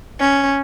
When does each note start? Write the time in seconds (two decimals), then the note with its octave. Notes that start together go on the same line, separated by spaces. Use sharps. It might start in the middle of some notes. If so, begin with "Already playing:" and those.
0.19 C#4